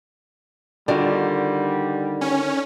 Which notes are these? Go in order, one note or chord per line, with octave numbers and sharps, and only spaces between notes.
D3 D#3 G3 F4 F#4 D5
C#4